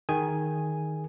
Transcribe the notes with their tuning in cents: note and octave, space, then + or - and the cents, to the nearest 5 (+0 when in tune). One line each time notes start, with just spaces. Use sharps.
D#3 +0 G#4 +0 G#5 +0